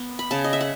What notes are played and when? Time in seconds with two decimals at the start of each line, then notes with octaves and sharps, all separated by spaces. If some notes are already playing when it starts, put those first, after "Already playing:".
Already playing: B3
0.19 B5
0.31 C#3 A5
0.44 D#5
0.53 E5
0.61 F#5